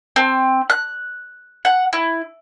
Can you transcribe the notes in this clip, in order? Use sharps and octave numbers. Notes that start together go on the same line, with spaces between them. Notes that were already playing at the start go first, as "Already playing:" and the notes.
C4
F#6
F#5
E4